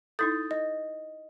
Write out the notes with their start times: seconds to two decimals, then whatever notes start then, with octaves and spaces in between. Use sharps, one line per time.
0.19 D#4 E4 A4 D#6 G6 A6
0.51 D#5